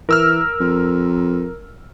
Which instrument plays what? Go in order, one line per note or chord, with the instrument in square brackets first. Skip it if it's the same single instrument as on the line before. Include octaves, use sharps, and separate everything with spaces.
[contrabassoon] E3 [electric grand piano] A#4 E6 F6
[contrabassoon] F2